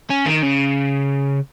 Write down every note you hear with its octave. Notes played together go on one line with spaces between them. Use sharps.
C#4
D#3
C#3